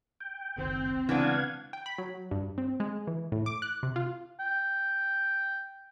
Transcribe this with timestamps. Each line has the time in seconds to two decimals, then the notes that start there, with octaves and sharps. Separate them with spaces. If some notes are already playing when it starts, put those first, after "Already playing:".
0.20 G5
0.58 F#1 C2 D#3 C4
1.09 C#3 E3 G#3 B3 D4 F5 F#5 G#6
1.73 G5
1.86 B5
1.98 F#3
2.31 G2
2.58 C4
2.80 G#3
3.07 E3
3.32 A2
3.46 D6
3.62 F#6
3.83 C3
3.96 F4
4.40 G5